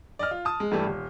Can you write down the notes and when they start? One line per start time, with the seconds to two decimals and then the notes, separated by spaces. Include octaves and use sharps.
0.19 D5 D#5 F6
0.31 F4
0.45 A5 D#6
0.60 G#3
0.71 G2 E3 A3 G4
0.86 D#1